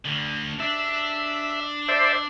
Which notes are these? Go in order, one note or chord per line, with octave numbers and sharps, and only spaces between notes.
D2 D3
D4 E5
C5 D5 E5